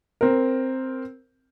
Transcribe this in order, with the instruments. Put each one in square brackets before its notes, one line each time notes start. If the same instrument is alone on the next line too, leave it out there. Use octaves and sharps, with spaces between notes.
[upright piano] C4 A#4